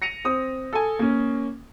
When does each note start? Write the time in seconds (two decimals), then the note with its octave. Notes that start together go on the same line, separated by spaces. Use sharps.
0.02 A#6 C#7 D#7 F7
0.25 C4 D#6
0.73 A4 G#5
0.99 A#3 C#4